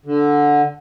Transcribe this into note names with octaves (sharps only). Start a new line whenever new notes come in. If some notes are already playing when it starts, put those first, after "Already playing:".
D3